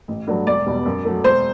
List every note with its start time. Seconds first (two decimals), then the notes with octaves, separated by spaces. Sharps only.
0.08 A1
0.27 G2 F#3 A3
0.47 E1 D5
0.66 E2 B2 G3
0.85 F#2
1.05 F#3 A3
1.24 E1 C5